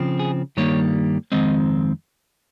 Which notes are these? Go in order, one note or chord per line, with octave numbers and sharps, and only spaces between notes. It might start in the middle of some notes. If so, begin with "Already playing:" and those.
Already playing: C#3 F3 C4
G#4
G2 D#3 G3 A#3 C#5
F2 D#3 G#3 C4 D#5